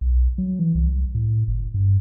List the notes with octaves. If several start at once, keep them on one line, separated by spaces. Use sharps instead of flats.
B1
F#3
E3
C2
A2
G1
G2